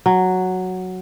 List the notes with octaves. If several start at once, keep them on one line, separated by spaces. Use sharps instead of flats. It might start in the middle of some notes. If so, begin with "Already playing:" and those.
F#3